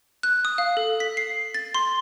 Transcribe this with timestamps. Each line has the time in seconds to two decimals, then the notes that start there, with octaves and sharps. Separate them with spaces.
0.23 F#6
0.45 D#6
0.58 F5
0.77 A4
1.00 B6
1.17 C7
1.54 A6
1.75 C6